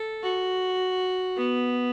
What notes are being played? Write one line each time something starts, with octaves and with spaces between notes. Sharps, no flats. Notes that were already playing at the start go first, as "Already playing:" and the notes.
Already playing: A4
F#4
B3